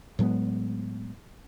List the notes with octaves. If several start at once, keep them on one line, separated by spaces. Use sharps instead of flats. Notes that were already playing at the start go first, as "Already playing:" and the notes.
A2 F#3 G#3 B3